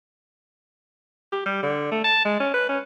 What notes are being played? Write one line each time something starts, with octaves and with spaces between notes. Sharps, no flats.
G4
G3
D3
A3
A5
G#3
C#4
B4
C#4